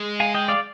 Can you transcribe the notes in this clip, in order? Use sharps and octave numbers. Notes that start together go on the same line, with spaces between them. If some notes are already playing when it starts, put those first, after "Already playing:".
Already playing: G#3
F5 G#5
D#5 G5
D5 F5